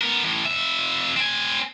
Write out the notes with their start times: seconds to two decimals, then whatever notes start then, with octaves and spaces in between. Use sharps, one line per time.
0.01 B3 A#4
0.24 A2 E3
0.46 F2 E5
1.17 C4 G#5